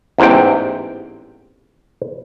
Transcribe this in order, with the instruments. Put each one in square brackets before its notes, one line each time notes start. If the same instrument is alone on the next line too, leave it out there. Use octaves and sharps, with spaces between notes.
[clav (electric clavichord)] A1 E2 G#2 C3 G5